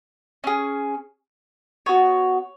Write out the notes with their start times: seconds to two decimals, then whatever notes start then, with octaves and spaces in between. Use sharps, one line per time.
0.44 C#4 G#4
1.86 B3 F#4 C#5